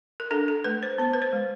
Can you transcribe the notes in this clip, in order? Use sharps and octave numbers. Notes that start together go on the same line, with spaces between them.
A#4
D4 A4
A4
A3 B4
C5
B3 C5
B4
C5
G#3